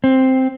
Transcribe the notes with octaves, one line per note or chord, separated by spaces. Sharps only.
C4